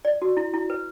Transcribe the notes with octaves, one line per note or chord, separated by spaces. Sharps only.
D5
F#4
E4
E4
B4